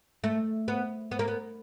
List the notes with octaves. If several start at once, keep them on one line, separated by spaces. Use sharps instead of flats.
A3
B3
B3
A#3
B3